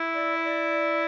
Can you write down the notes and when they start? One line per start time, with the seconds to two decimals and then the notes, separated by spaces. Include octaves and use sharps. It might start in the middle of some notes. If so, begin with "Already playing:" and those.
Already playing: E4
0.14 D5
0.44 D5